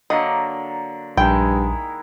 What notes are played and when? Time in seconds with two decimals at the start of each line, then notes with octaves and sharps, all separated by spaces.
0.10 D3 F#3 A#3 D#5
1.17 A#1 G2 D#3 G#3 E4 G5